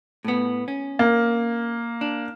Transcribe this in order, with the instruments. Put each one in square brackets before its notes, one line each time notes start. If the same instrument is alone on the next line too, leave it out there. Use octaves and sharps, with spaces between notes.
[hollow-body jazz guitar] A2 B3
C#4
[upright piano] A#3
[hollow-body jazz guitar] D4